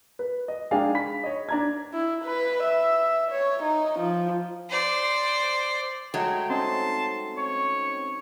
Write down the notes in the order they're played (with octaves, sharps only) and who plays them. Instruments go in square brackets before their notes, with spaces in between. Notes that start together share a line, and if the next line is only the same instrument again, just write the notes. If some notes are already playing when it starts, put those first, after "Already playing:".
[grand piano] B4
D#5
G#3 D4 D#4 G#4 F5 G5
B5 B6
C#5 D#5
D4 A#5 G#6
[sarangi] E4
B4
E5
C#5
D#4
F3
[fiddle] C5 D5
[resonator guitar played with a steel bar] F#3 G#3 A3 [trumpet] G5
[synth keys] C4 C#4 D#4 [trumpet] A5 [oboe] C6
[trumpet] C#5 [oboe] C#6